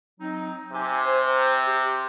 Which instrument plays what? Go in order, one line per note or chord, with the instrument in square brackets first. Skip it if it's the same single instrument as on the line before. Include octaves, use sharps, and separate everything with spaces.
[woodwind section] F#3 C4 D#4
[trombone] C3 [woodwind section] G4 C5 G#5
[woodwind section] C5
G4